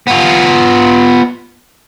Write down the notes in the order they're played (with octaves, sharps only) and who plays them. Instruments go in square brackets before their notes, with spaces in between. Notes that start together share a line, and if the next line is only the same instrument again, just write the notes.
[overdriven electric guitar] B3 F4